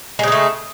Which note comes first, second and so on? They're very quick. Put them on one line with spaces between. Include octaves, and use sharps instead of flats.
G#3 C#3 D#4 A3